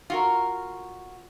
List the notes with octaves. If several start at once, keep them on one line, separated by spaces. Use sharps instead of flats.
F4 F#4 A#4